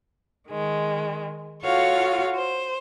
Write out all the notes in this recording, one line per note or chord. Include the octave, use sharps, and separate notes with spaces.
D#3 G#3
F4 F#4 A4 C#5 F5
C5